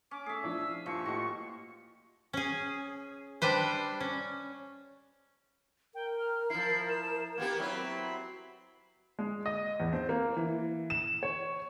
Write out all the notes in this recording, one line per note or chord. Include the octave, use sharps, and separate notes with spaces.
C#4 D6
A3 G#4 E5
F3 D4 E4 E6
G2 A#2 F3 F4 C#6
A2 F#4 G4 D#5
C#4 G#4
G3 D4 B4 C5
C#4
A#4 G5
F6
F3 E4 C7
E7
A#3 B3 G4 G#6
F#3 C4 E4 B5
G#3
D#5
E2
C4
A#3
E3
E7
C#5